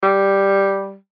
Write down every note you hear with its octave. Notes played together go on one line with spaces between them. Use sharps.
G3